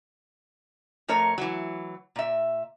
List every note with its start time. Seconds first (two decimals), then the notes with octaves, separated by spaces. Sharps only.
1.08 F2 A3 A#4 C#5
1.38 E3 F#3
2.16 A#2 E5